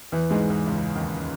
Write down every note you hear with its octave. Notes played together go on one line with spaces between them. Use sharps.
E2 E3
G#2 G#3
E2 E3
C#2 C#3
D#2 D#3